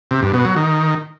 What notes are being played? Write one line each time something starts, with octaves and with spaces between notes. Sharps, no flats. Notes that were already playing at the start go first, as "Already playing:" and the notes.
C3
G2
B2
F#3
D#3